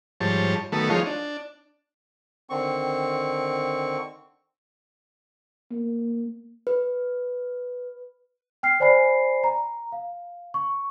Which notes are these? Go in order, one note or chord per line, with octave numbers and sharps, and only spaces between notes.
G#2 F3 G3 C#5 A5
D#3 F#3 A3 B3 A4
F3 G#3 D#4 F4 C#5
D4
D3 D#3 C4 C#6
A#3
B4
G5 F6 C7
C5 D5 G#5 B5 C7
A#5
F5
C#6